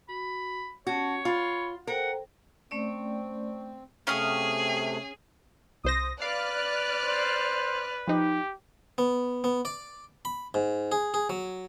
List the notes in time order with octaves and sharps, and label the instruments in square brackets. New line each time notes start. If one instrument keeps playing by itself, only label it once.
[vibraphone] F#4 [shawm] B5
[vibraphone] C#4 A5 [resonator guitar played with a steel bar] F#4 [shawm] C#5
[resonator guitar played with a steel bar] F4 [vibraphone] B5
[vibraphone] A4 C5 G5 [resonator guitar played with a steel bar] A#4 [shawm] F#5
[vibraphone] A3 C#4 D5 [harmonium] C4
[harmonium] C3 A3 [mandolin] C#4 F5 D#6 [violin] G#4 [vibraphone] G5
[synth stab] C2 C5 A#6 [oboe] D#6
[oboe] B4 [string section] D5 F6 F#6 [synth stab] F5
[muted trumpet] C5
[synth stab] F3 D#4 [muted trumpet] G4
[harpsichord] B3
B3
D5
B5
G#2
G#4
G#4
F#3